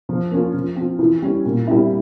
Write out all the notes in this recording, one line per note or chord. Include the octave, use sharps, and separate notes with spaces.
F3
A#3 C#4 F4
F3
C4 F4
E3
G3 C#4
A#2
G3 C4 E4